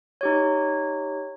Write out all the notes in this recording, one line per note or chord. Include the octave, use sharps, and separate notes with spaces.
D#4 G4 C#5